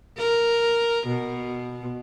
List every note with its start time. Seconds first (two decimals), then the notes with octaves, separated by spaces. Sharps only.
0.18 A#4
1.07 B2